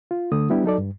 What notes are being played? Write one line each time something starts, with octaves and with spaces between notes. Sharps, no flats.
F4
D3 A3 D#6
G3 B3 D4 E4 G4
F#3 D#4 A4 D5
G2